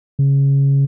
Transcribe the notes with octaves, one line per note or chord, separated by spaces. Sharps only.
C#3